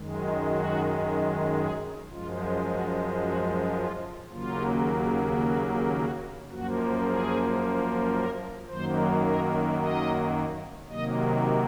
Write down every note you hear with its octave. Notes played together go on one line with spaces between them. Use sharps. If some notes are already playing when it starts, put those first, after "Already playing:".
Already playing: F#2 D#3 G#3
F#4
G#4
F#2 F3 G#3 F4
F#4
F#4
F4
D#2 C#3 F#3 A#3 F4
F#4
F#4
F#2 F3 A#3 F#4
G#4
A#4
F#2 D#3 F#3 A#3 C5
A#4
D#5
C3 D#3 F#3 A#3 D#5